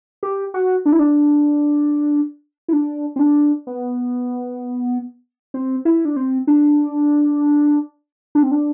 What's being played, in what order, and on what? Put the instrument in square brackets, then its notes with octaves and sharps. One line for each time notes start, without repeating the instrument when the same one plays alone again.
[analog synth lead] G4
F#4
D4
E4
D4
E4
D4
C4
D4
B3
C4
E4
D4
C4
D4
D4
C4
D4